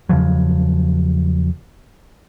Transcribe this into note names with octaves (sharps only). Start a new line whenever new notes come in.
E2 C#3 F3 F#3